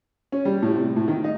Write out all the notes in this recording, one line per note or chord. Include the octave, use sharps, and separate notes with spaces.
C#4
G3
A2
C3
A2
D#3
D#4